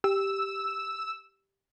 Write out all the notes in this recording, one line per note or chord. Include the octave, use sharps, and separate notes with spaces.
G4 E6